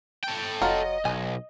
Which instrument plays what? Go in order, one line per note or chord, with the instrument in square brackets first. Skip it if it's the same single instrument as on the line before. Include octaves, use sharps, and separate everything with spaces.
[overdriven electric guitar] A4 G5
[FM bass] F1 [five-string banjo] F#3 F4 [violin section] D#5
[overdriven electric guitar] B1 [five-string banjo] G#5